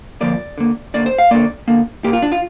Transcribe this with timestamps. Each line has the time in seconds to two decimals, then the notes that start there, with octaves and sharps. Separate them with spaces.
0.21 D3 F3 A#3 D5
0.58 D3 A#3
0.94 D3 A#3 D5
1.06 C5
1.18 F5
1.31 D3 A#3 D5
1.68 D3 A#3
2.04 A#2 A#3 G4
2.13 F4
2.22 D4
2.32 F4